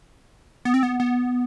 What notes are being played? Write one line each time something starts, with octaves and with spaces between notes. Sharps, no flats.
B3
C4
B3
B3